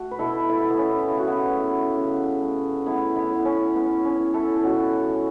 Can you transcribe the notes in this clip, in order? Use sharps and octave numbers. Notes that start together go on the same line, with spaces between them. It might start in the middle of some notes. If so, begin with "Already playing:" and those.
Already playing: A3 F#4
B4
B2 E4 A4
E4 A4
A3
B3
C#4
C#3 E4
F#4
B3 E4
A3
C#3
A3
A3 B3 E4
B3 E4
A2
C#4
A2 B3
C#4
E3
E4 A4
A4
B2 C#4 F#4
A3